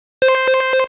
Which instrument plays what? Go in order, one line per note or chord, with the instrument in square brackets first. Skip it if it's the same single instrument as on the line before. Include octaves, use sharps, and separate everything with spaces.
[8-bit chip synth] C5